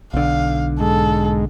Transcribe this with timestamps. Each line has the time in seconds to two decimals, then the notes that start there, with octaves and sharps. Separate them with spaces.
0.14 B1 D3 F5
0.80 G#2 G#3 A4